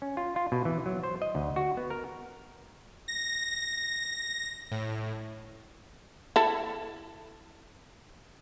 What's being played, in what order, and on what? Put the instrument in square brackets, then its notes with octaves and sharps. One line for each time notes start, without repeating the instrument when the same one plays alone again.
[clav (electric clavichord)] C#4
F4
F4
B2
E3
F#3
C5
D#5
D2
F#4
B3
A#4
[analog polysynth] A#6
A2
[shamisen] E4 A4